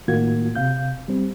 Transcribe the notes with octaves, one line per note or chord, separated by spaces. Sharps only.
A2 D#3 A#3 F4 F#4 G#6
C3 F5 G6
G3 C4